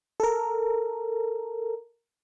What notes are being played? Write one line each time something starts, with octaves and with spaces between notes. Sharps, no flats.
A4 A#4